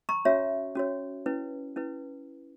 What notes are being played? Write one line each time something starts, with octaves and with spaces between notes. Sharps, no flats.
A#5 C#6
C#4 F#4 C#5 E5
C#4 F#4 C#5
C#4 E4 B4
C#4 E4 B4